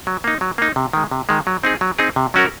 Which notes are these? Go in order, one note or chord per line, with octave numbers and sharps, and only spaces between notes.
F#3
A#3 D#4
F#3
A#3 D#4
C3
D#3 G#3
C3
D#3 G#3
F#3
C4 D#4 G#4
F#3
C4 D#4 G#4
C3
F#3 C#4 F#4 A#4